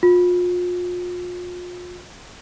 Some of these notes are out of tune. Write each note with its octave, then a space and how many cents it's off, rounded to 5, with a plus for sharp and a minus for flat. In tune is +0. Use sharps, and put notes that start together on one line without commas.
F4 +35